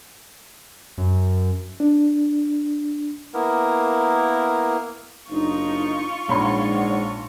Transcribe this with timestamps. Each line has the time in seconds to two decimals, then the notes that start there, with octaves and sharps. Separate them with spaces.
0.98 F#2
1.80 D4
3.34 A#3 B3 E4 A#4
5.30 F#1 D4 D#4 F4 C#6
6.29 A#1 G#2 C#5 D5 F#5 B5 C6